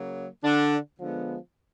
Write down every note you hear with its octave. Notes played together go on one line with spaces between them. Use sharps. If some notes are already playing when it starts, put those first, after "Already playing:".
Already playing: C#3 F#3 A#3
D3 D4
D3 F3 G#3 B3